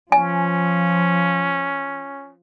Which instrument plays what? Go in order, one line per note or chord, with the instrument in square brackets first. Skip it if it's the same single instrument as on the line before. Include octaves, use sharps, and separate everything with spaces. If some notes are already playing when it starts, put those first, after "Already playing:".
[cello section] F3 [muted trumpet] C#4 [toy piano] G#5